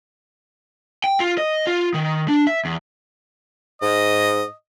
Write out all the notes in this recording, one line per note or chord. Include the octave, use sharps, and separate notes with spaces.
G5
F4
D#5
F4
D#3
D4
E5
E2
G#2 D#5